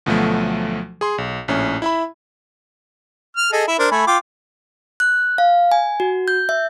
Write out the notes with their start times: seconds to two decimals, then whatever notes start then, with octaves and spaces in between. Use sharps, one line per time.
0.06 D2 B2 F3 F#3 A3
1.01 G#4 C6
1.18 B1
1.48 A#1 A2 C#4
1.82 E4 E5 B5
3.37 F6
3.52 G#4 A4 D#5
3.67 E4 E5
3.79 D4 A#4 C5
3.91 A3 G#5 B5
4.07 F4 G5 D6
5.00 F#6
5.38 F5
5.72 G#5
6.00 F#4
6.28 G6
6.49 E5